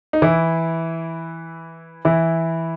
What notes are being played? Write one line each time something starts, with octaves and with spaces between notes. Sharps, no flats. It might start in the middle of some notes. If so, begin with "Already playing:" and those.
D#4
E3 E4
E3 E4